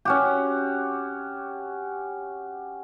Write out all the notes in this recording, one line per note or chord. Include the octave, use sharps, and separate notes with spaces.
C#4 F#4 G4